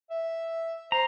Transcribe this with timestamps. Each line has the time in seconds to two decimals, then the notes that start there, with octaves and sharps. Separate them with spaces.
0.10 E5
0.92 C5 A#5